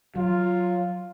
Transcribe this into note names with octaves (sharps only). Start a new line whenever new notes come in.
F#3 F4